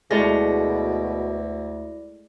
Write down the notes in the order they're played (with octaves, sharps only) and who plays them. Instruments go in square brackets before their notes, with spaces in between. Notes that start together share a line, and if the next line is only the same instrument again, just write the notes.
[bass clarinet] D2 [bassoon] B2 [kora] G#3 A3 [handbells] E4 D5 A#6